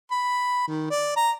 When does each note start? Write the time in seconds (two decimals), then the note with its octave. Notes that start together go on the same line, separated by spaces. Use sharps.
0.11 B5
0.68 D#3
0.90 D5
1.17 A#5